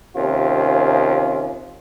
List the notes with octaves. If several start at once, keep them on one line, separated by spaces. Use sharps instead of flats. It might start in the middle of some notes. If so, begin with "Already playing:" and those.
D#2 C3 C#4 F4